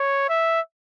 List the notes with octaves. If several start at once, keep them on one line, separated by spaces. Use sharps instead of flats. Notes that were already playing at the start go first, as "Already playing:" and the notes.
Already playing: C#5
E5